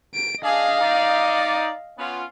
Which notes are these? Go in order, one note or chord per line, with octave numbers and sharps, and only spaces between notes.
D7
D4 G#4 D#5 F5
D#4 D5
B3 C#4 F4